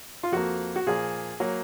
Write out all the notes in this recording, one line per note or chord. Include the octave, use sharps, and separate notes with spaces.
F4
F2 F3 A#3 F#4
F#4
A#2 F3 A#3 G#4
F#3 A#3